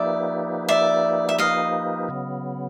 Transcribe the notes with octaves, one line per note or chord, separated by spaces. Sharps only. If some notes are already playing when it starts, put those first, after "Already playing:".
Already playing: F3 A#3 D#4 G4 B4 D5 E5
D5 E5
E5
D#5 F5
C#3 F#3 B3